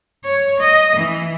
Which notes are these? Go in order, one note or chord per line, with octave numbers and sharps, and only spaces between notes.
C#5
D#5
E3